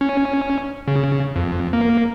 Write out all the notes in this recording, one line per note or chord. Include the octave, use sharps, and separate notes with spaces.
C#4
C#3
F2
A#3